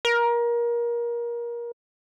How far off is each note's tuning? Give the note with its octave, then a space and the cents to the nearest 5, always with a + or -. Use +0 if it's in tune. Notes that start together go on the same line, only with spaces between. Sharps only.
A#4 +25